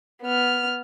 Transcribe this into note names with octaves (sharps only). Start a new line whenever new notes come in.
B3 F6